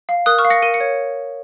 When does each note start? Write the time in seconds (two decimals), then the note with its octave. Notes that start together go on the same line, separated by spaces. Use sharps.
0.09 F5
0.26 A#4 D#6 F#6
0.39 C#6 F6
0.45 F5
0.50 A#6 C#7
0.62 A#4 D#7
0.74 C#7
0.80 C#5